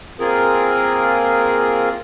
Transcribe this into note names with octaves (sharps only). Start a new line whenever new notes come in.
A#3 C4 F4 G#4 A#4